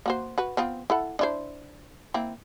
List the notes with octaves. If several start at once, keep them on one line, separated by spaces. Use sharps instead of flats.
A#3 F#4 C5
F#4 B4
B3 C4 F4
E4 A4 F#5
D4 E4 C5
A#3 C4 E4